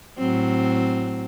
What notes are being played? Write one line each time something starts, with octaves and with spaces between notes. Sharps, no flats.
A2 F#3 C4